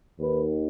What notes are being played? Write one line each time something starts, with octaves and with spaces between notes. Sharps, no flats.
D#2 D#3 B4